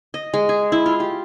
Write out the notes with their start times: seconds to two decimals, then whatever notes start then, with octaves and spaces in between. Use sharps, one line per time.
0.14 D#5
0.34 G#3
0.49 G#4
0.72 E4
0.86 F4
1.00 G4